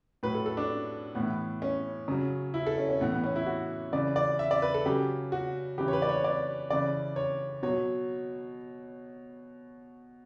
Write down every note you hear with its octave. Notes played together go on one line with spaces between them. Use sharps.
A2 F#3 B4
A4
A4
D4
A2 E3 B3
C#4
C#3 F#3
E4
A4
C#4
C#4
A2 E3 B3
B3
C#4
E4
F#4
C#3 E3 D5
D5
E5
D5
B4
A4
C#3 F#3 G4
F#4
C#3 E3 G4
C#5
B4
D5
C#5
D5
C#3 E3 D5
C#5
B2 F#3 C#5